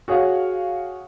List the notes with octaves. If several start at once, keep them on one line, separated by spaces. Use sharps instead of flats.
F#4 G#4 C#5 F5 F#5